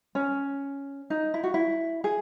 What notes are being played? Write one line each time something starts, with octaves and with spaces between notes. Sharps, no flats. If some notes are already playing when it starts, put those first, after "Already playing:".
C#4
D#4
E4
F#4
E4
G#4